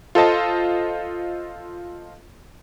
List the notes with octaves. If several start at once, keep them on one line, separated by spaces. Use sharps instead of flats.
F4 A4 C5 D#5 A5